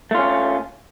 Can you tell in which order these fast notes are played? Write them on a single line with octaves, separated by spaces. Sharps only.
A3 F4 C#4